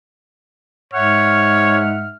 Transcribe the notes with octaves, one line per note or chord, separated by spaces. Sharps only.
G#2 C#5 E5 F#5 F6